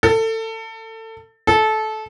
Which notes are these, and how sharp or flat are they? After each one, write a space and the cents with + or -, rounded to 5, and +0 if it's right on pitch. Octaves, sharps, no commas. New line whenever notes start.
A4 +25
A4 -20